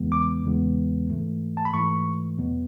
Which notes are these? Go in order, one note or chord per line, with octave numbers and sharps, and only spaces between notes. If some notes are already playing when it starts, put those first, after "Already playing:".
Already playing: E2 C#3 E3 G#3 B3
D6
E2 C#3 E3 G#3 B3
G#2 E3 A3
A5
B5
G#2 E3 A3 C#6
E2 B2 F#3 B3